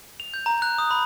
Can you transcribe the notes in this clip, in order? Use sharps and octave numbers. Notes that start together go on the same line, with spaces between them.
F7
G6
A#5
F#6
D#6
B5